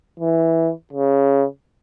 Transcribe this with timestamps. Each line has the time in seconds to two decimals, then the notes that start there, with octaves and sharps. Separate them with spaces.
0.20 E3
0.93 C#3